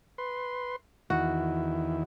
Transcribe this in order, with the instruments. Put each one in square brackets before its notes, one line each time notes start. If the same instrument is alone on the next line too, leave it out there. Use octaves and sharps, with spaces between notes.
[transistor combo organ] B4 C6
[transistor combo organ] E2 D#3 E4 [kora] F#4